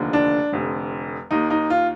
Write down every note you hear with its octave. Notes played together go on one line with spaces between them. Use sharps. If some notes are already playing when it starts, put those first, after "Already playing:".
Already playing: F1 D#2 D3 F3
D4
F1 F2 D3
D#2 D#3 D#4
D#4
F4